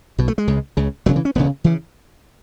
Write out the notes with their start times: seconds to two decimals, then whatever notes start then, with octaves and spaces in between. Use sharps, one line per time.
0.18 B1 B2
0.28 A3
0.38 G#3
0.48 C#2 C#3
0.77 C#2 C#3
1.06 E1 D2 C#3 F#3
1.16 E3
1.25 C#4
1.35 E1 D2 C#3 B3
1.64 C#3 E3